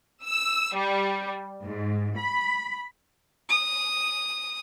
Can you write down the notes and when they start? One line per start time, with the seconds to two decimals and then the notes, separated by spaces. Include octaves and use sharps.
0.24 E6
0.74 G3
1.61 G#2
2.17 B5
3.49 D#6